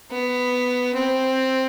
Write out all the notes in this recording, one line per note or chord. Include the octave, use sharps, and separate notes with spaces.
B3
C4